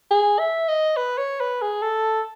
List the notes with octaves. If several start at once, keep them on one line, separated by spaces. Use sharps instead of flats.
G#4
E5
D#5
B4
C#5
B4
G#4
A4